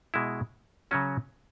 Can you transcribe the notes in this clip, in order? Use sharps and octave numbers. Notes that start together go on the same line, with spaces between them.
B2 G#3 E4
C#3 F#3 C#4 F#4